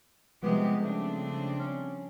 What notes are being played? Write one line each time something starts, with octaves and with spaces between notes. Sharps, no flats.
C3 F3 G3 G#3 B3 G4
C#3 A3 C4 D4
C#4